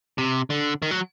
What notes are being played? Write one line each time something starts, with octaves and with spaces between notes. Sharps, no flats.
C3
D3
D#3
F#3